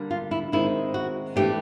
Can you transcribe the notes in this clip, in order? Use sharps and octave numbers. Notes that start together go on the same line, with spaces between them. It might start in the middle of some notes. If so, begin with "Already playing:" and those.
Already playing: D3 G3 A#3
F4
E4
D#3 G#3 C4 D#4 E4
F#4
E3 A3 D4 G4